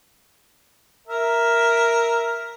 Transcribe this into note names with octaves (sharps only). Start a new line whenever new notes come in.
A#4 E5